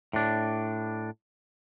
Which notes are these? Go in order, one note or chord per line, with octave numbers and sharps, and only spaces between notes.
A2 D4